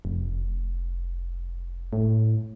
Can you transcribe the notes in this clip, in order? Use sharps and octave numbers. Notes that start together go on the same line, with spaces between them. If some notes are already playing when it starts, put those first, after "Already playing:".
F1
A2